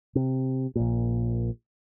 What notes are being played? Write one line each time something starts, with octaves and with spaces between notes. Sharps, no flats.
C3
A#1 A#2